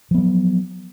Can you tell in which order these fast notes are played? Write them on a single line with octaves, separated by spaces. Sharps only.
F3 B3 F#3